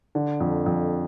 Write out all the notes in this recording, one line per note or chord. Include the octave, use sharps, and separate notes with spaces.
D3
F2
F2